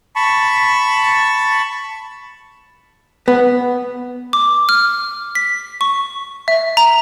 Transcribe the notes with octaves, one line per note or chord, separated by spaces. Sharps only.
A5 B5 C#6
B3
D6
F6
B6
C#6
E5
A#5